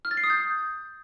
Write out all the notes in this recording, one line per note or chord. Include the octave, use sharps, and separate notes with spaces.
F6
A6
C7
D#6
G6